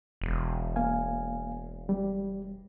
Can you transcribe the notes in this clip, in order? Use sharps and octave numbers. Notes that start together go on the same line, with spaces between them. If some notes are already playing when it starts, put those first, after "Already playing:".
E1
A#3 F5 G#5
G3